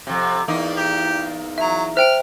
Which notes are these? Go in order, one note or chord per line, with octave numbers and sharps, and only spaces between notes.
F2 C3
E2 A#3 D#4
G4
F#3 E5 A#5
C5 E5 G5 F6 D7